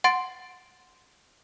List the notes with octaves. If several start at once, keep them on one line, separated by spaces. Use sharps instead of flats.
F#5 C6 A6 D7